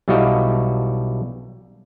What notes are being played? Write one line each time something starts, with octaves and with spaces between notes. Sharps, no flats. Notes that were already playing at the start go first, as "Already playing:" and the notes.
B1 G3 E4 F#4 D#5 F5